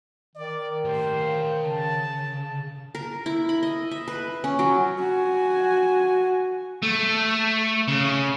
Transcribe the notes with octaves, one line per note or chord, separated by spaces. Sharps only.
D#3 D5
A2 G4 C5
C#5 F5
C#3 A5
A#4
E4
B5
D#5
E5
B4
C#4
F#3
F#4 G#5
A3
C#3